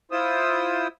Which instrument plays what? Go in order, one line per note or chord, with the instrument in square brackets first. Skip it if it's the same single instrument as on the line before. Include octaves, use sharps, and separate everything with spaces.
[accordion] E4 F4 C5 D#6 E6